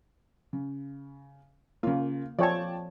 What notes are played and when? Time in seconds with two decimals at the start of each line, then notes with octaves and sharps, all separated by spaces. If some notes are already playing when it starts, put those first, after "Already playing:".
0.53 C#3
1.83 C#3 A#3 F4
2.39 F3 A4 C#5 D5 G5 A5